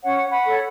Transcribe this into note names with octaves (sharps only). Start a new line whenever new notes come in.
C#4 C#5 F#5
F#5 B5
A4 C#5